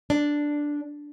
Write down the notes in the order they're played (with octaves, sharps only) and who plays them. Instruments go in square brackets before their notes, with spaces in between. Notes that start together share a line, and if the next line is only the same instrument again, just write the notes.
[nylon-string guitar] D4